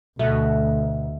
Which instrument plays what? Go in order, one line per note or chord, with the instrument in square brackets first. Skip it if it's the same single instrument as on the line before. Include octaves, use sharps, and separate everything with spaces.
[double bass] D2 [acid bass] B2 [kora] A3 F#4